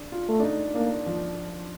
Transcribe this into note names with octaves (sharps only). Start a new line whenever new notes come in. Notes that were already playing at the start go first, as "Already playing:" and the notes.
Already playing: D4
F4
A3
D4
D#4
A#3 D4
F3